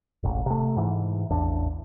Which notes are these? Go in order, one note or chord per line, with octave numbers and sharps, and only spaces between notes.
E1 A1
C3 A3
G#2 E3
A1 E2 D4